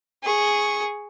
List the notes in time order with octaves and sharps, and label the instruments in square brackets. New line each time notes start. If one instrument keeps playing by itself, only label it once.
[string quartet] G#4 C#6